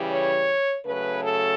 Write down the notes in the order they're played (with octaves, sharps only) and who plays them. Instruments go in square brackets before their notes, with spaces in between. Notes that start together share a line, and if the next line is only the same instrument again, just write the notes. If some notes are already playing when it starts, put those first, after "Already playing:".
Already playing: [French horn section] C#3 E3 G3
C#5
C#3 F#3 A3 B4
A4